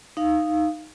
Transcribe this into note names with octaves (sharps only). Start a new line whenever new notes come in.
D#4 F5